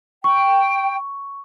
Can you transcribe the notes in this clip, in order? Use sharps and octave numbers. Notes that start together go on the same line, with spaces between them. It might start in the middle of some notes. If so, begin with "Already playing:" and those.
G5 C#6